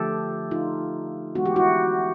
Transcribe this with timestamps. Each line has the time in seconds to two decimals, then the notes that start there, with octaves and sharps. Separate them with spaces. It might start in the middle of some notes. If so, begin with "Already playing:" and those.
Already playing: D3 F3 A3 G4 A4
0.51 D#4 F4
1.35 E3 G#3 B3 F#4
1.46 G4
1.56 E4 F#4